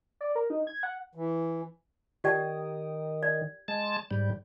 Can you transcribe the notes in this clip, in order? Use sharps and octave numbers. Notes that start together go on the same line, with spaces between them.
D5
A#4
D#4
G#6
F#5
E3
D#3 G4 D5 G5
D5
G#3 A5
G#2 G3